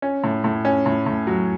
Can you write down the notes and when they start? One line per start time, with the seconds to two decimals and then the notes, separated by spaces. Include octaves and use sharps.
0.02 C#4
0.24 A2
0.44 A2
0.65 C#4
0.86 A2
1.06 A2
1.27 F#3